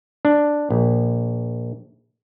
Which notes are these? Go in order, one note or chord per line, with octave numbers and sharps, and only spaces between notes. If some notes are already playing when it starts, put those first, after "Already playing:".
D4
A#1